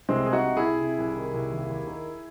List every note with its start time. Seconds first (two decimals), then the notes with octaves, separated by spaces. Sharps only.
0.09 C2 G#3 C4
0.26 C2 G#4
0.32 D#4 F#4
0.44 C3
0.57 E4 G#4
0.63 C3
0.80 C3
0.98 C2
1.16 D#3
1.34 C2
1.52 D#2
1.70 D#2
1.87 D#3